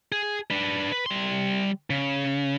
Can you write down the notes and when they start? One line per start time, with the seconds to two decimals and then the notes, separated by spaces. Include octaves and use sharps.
0.12 G#4
0.50 D4 B4
0.92 B4
1.06 G3 C6
1.90 C#3